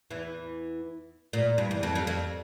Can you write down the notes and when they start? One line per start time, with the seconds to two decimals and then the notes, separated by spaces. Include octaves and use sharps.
0.10 E2 E3
1.33 A#2
1.58 G2
1.71 E2
1.83 F2
1.95 F2
2.07 F2